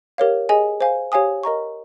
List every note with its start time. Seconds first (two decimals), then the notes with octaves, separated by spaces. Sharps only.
0.18 G4 A#4 C#5 F5
0.49 G#4 D#5 G#5
0.81 C5 F5 G#5
1.12 G4 C#5 F5 G#5 D#6
1.43 A#4 D#5 A#5 C#6